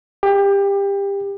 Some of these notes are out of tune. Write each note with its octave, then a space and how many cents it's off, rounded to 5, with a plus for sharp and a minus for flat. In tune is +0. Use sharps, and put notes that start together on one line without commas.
G4 +25